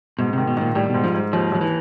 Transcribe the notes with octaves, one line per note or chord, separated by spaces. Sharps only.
G#2 B2
C3 D#3
B2
A#2 D#3
A2 G3
G#2 B2
F3
G#2
D#2 F3
D#2 F3
E3